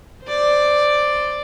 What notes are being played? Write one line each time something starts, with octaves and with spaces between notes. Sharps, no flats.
C5 D5